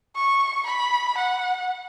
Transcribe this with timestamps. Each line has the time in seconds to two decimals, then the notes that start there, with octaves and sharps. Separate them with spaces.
0.16 C#6
0.67 B5
1.18 F#5